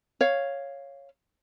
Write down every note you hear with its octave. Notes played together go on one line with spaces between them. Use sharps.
C#5 F5